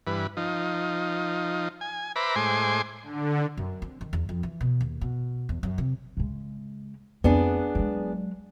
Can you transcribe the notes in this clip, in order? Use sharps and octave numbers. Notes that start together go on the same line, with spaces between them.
G2 E3 B4
F3 D#4
G#5
B4 C5 E5 A#5 B5 D6
A2 G#3 C5 G#5 C6 D6
D3
F#2
C4
D#3
E2
F2
E3
B2
D#2
B2
E2
F#2
C3
C#3 G#3
F2 A3 B3 D4 G#4
F#3 G#3